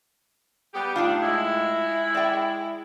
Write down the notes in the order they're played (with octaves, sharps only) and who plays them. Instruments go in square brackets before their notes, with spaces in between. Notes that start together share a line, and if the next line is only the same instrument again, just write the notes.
[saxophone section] G3 B3 G4
[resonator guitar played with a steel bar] A2 D#4 F4 [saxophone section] D4
[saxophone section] G#3 E4
[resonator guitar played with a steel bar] D5 G5